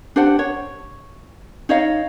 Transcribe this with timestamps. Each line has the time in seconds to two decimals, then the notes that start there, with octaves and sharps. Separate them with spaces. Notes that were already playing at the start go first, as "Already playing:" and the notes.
0.16 D4 G4 C5 F#5
0.39 C#5
1.69 D#4 C#5 D#5 F5